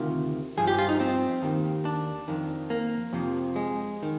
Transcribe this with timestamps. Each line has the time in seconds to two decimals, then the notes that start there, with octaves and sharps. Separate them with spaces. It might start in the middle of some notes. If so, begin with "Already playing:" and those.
Already playing: D2 C3 D#3 F4
0.57 G2 F3 G#4
0.67 G4
0.78 F4
0.89 D#4
1.00 C4
1.43 D#2 D#3
1.85 D4
2.28 F2 D#3
2.70 A#3
3.13 F2 C3 F3
3.56 G#3
4.03 D#3